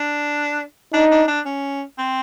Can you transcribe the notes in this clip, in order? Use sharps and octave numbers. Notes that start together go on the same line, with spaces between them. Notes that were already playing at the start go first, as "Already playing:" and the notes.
Already playing: D4
D4 D#4
D4
D4
C#4
C4